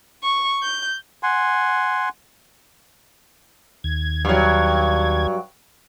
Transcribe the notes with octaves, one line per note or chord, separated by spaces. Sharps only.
C#6
G6
F#5 G#5 C6
D#2 G#6
G2 F#3